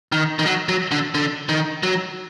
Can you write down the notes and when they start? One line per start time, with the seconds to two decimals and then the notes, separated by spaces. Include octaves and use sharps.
0.12 D#3
0.39 D#3
0.46 F#3
0.69 F#3
0.92 D3
1.15 D3
1.49 D#3
1.83 F#3